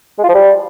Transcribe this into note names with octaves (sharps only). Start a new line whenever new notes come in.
G#3
F4
F3
G3